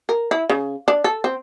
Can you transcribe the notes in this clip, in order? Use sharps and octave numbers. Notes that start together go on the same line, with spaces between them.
A#4
E4
C#3
D4
A4
C4